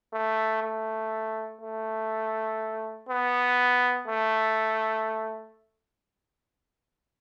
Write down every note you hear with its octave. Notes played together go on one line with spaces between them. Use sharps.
A3
A3
A3
B3
A3